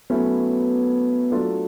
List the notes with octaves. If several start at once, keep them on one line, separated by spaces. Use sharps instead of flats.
F#3 A3 B3 C#4 E4
F#3 A3 D4 F4 A4